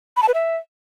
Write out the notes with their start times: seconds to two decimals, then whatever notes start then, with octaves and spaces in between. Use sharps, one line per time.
0.17 B5
0.22 A5
0.28 B4
0.34 E5